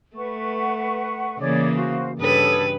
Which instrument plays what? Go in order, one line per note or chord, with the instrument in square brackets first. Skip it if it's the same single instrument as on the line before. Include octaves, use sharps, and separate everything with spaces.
[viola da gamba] A3 [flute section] B4 F#5 C#6
[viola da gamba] C#3 E3 A#3 [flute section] C#5 D5 D6
[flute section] F#4 C5 F5
[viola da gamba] G2 C#3 B4 [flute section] A4 C#5 D#6